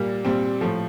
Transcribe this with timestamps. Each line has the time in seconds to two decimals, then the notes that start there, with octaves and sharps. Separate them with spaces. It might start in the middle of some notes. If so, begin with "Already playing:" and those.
Already playing: A#2 G3 A#3
0.25 A#2 G3 C4
0.61 A2 F3 A3